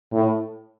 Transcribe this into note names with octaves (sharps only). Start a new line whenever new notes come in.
A2